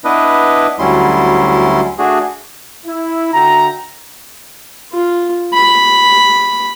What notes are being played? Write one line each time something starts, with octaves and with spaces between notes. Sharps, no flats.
B3 D4 E4 B4 D#5
D2 F#3 G3 C#4 E4 C6
A3 D4 F#4 G#4
E4
D3 F#4 E5 G5 A#5
F4
B5